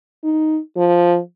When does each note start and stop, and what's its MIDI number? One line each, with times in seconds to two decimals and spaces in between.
0.24 0.60 63
0.77 1.19 53